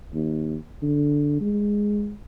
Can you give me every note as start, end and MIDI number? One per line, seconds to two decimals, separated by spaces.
0.14 0.56 39
0.82 1.39 50
1.41 2.13 56